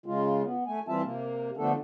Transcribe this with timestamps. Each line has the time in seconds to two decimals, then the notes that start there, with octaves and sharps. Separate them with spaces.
0.06 C#3 G#3 F4
0.43 B3
0.67 A3 G#5
0.88 E3 G3 C4 F4 E5 A5
1.04 C3 A#3
1.57 D3 F3 A3 B3 D4 A4